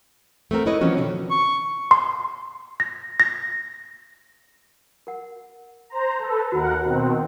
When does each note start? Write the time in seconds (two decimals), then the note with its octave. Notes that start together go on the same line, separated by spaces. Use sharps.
0.51 A3 B3 C4 A#4
0.66 E4 A4 B4 C#5 D#5
0.81 E3 F3 C4 C#4 F#4
0.97 B2 D3 D#3
1.30 C#6
1.91 C6
2.80 A#6
3.20 A#6
5.07 A#4 F#5
5.90 C5 A#5
6.19 A4 B4 A#5
6.52 D#2 F#4 A#4 F#5 B5
6.84 B2 D#3 C4